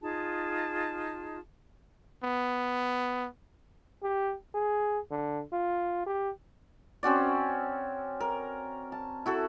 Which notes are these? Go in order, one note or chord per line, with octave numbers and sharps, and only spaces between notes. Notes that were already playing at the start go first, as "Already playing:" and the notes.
D#4 F4 G#4 A5
B3
G4
G#4
D3
F4
G4
C4 C#4 F#4 D5
A#4
A5
E4 F#4 A4